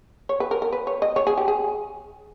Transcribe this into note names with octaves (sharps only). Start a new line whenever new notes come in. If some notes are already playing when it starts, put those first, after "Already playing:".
C#5
B4
A#4
A#4
B4
C#5
D#5
C#5
G#4
G4
G#4